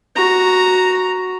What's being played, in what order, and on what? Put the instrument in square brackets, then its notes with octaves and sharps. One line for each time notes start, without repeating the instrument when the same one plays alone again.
[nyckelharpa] F#4 A#5